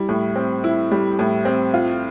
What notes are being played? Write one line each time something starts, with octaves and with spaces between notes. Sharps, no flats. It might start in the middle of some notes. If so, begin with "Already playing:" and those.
Already playing: G3 E4
A2
C4
E4
G3
A2
C4
F4